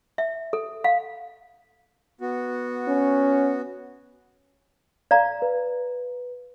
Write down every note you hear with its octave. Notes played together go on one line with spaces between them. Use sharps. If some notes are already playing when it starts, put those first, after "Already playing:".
E5
A4
F5
B3 F#4
C#4
D5 F5 A#5
B4